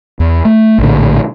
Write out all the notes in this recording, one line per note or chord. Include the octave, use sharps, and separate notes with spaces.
E2
A3
A#1 A2 D3